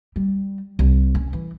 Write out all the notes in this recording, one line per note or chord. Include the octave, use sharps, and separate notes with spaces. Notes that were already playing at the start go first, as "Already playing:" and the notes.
G3
C2
C#4
E3